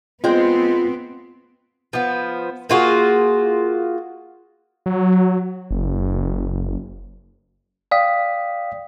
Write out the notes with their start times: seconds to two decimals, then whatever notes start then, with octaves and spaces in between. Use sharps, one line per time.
0.24 G#3 B3 C4 F4 C5 G5
1.93 F3 B3
2.69 A#3 F4 F#4 G#4
4.86 F#3
5.71 F#1
7.91 D5 F5 G5 D#6 B6